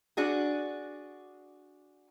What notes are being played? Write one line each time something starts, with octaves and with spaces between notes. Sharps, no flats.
D4 F#4 G#4